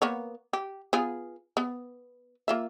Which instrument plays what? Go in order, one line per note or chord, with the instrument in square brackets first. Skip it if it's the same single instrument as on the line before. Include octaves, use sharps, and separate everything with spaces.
[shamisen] A#3 B3 C#5
G4
B3 F4 G#4
B3
A#3 F4 E5